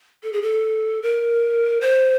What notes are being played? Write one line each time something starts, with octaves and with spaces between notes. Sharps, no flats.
A4
G#4
A4
A#4
C5